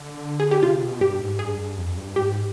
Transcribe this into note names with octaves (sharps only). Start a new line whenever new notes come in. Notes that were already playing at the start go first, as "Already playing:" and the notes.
Already playing: D3
G#4
G4
C3 F4
B2
G2 G4
G#2
G2 G#4
G2
F2
G2
G#2 G4